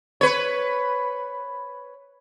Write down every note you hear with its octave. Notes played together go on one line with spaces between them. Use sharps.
B4 C#5